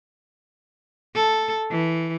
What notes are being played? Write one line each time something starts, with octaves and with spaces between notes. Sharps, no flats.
A4
E3